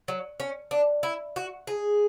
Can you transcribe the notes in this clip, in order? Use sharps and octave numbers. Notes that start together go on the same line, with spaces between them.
F#3
C#4
D4
E4
F#4
G#4